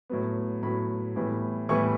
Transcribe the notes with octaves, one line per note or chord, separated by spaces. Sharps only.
A2 F#3 B3
A2 F#3 B3 B5
A2 E3 G3 B3
A2 E3 G3 B3 C#6